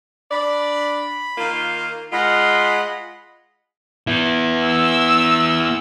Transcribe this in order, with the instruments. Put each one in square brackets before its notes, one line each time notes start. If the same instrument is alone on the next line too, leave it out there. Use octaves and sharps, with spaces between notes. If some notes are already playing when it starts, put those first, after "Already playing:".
[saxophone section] D4 D5 [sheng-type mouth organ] B5
[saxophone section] D#3 A#3 F4
[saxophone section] G#3 F4 [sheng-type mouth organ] D#5 F#5 B5
[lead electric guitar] B3 E4
[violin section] E6